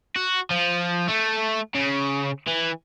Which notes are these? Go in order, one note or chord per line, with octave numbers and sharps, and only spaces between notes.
F#4
F3
A3
C#3
E3